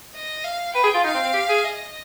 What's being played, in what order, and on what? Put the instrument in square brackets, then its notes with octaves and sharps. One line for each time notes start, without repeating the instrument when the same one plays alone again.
[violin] D#5
F5
[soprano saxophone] B4 [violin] G5
[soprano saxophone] G#4
F4
[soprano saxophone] D#4 [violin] F5
[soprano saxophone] C4
C4
G4
G#4
[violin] D#5